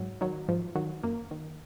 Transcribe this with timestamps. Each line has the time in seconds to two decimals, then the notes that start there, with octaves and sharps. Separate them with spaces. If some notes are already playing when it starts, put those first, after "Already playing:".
Already playing: G#2 F#3
0.21 D#3 F#3
0.48 G#2 F3
0.75 D#3 F#3
1.03 F#2 A#3
1.31 D#3